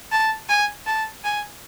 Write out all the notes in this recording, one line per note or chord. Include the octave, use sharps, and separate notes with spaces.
A5
G#5
A5
G#5